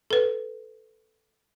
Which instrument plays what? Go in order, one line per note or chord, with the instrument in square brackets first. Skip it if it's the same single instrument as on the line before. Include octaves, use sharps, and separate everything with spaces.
[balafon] A4 B4